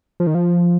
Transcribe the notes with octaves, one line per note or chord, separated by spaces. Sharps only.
F3
D#3
F3